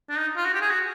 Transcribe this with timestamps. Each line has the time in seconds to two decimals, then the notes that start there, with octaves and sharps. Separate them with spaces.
0.10 D4
0.18 D#4
0.37 F4
0.45 F#4
0.54 G4
0.62 G#4
0.70 F#4